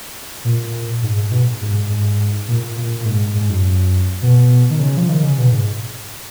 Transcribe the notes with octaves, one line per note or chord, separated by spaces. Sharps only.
A#2
G#2
G#2
B2
G#2
G#2
A#2
A#2
A#2
A#2
G#2
G#2
F#2
B2
D#3
C#3
F3
D#3
C#3
B2
G#2